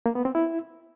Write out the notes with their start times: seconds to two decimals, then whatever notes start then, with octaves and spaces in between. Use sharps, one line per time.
0.06 A#3
0.15 B3
0.25 C4
0.35 E4